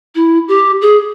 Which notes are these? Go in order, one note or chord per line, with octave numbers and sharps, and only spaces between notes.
E4
G4
G#4